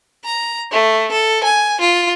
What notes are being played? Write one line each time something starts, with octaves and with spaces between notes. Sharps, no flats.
A#5
A3
A4
G#5
F4